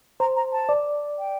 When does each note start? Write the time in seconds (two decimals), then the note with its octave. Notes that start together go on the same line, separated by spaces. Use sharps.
0.20 C5 A#5
0.36 A#5
0.53 A5
0.69 D5
1.19 G5